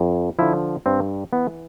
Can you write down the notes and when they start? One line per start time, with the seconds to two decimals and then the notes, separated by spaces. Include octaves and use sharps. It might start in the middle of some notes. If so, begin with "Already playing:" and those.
Already playing: F2
0.39 D3 F3 E4
0.86 G2 C4
1.33 E3 B3